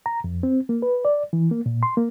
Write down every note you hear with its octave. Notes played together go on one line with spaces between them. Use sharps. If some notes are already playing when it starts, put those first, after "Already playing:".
A#5
F2
C4
A#3
B4
D5
E3
A#3
A#2
C6
A#3